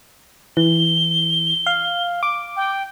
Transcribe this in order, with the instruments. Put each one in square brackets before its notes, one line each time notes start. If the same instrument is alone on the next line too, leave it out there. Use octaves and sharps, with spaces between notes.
[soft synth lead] E3 [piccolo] G7
[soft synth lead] F5
D6
[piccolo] G5